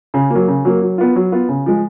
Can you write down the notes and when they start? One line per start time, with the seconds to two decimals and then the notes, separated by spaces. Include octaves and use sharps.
0.14 C#3
0.30 F#3 A#3
0.48 C#3
0.65 F#3 A#3
0.81 F#3
0.98 B3 F4
1.16 F#3
1.32 B3 F4
1.49 C#3
1.66 F3 G#3